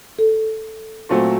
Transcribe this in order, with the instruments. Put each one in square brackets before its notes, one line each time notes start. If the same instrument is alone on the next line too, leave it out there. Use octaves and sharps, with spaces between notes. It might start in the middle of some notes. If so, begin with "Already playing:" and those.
[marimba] A4
[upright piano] A#2 F#3 A3 C4